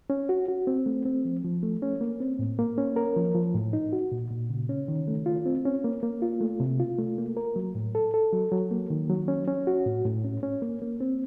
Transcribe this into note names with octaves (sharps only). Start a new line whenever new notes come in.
C#4
F#4
F#4
C4
A3
C4
F3
F3
A3
C#4
A#3
C4
A2
A#3
C#4
A#4
F3
F3
A2
D#4
F#4
A#2
A#2
C#3
C#4
D#3
A3
F4
C4
C#4
A#3
A#3
F4
A3
C3
F4
A3
A#3
A#4
F#3
A2
A4
A4
F#3
F#3
A#3
D#3
F#3
C#4
C#4
F#4
A2
A2
C#4
C#4
A#3
A#3
C4